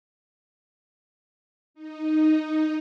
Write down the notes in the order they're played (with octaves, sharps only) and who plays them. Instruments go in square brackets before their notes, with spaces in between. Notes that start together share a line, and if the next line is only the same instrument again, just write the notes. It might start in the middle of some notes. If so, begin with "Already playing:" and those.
[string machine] D#4